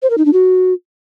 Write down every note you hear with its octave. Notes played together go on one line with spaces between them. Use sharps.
C5
A#4
D#4
D4
F#4